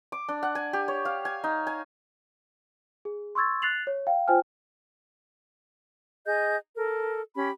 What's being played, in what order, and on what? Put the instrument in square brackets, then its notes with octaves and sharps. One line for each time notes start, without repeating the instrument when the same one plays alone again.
[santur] D6
D4
F#5
G#5
G4
C#5
F5
G#5
D#4
G#5
[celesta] G#4
C6 C#6 E6 G#6 A6
F#6 A6 C7 F7 F#7
C#5
F5 G5
F4 C5 G5 G#5 F6
[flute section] G#4 D#5 G6
A4 A#4
C#4 G4 B5